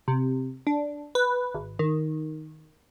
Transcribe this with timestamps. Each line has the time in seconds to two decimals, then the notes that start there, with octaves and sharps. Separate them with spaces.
0.08 C3
0.67 D4
1.15 B4
1.54 G#1
1.79 D#3